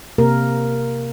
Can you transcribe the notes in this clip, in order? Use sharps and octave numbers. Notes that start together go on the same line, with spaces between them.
C3 A#3 A#4